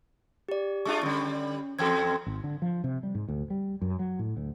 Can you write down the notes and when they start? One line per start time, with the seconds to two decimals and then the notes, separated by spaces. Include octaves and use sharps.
0.49 G4 D5
0.85 G#3 D4 F4 C#6
1.03 D3 G3 C#4
1.79 E2 C4 A4 G5 G#6
2.26 G#1
2.44 D3
2.62 F3
2.84 C3
3.03 G3
3.15 G#2
3.28 D2
3.50 G3
3.81 F#2
3.99 F#3
4.19 A2
4.37 D2